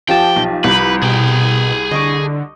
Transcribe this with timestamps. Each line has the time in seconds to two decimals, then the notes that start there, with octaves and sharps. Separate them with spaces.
0.08 F3 G4 G5 A5
0.36 B1
0.64 C2 B4
1.02 B2 G#4 G5
1.91 D3 D#5 C#6 D6